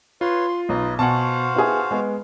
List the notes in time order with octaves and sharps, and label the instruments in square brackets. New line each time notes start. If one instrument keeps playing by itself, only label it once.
[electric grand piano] F4 [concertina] B4 C#5 C6
[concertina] C6
[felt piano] B1 [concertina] D#4 B4 D#5
[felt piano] B2 G#5 [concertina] F#4 C5 F5 [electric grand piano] F#5 A5
[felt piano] B3 E4 G#4
G#3 B3